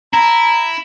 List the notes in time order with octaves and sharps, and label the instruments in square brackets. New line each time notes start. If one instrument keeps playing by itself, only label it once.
[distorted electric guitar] E4 [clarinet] A#5